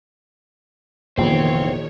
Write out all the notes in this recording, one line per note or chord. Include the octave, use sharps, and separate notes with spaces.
F1 A#1 D#3 E3 B3 C5 C#5 G5